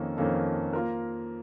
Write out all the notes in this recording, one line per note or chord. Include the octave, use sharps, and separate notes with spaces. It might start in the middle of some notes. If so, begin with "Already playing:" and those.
Already playing: F2 D#3 A#3 C#4 A4
F2 D#3 A#3 C#4 A4
A#3 F4 A#4